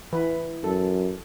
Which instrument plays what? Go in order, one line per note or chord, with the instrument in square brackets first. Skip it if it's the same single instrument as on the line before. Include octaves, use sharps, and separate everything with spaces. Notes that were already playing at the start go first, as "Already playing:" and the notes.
[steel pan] E3 B4
[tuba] F#2 [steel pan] A4